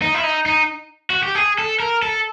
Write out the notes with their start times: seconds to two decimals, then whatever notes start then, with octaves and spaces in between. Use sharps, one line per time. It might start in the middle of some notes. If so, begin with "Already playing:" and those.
0.02 D#4
0.14 E4
0.23 D#4
0.46 D#4
1.10 F#4
1.23 G4
1.35 G#4
1.59 A4
1.80 A#4
2.03 A4